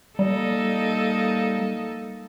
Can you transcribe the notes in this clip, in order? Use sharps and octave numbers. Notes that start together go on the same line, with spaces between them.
G3 A#3 D#4 A4